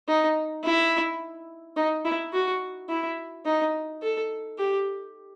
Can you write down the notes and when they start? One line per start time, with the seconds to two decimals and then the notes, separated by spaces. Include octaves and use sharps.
0.08 D#4
0.64 E4
1.77 D#4
2.05 E4
2.33 F#4
2.89 E4
3.46 D#4
4.02 A4
4.58 G4